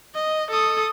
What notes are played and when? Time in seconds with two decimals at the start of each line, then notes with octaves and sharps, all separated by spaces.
0.15 D#5
0.51 A4 D#6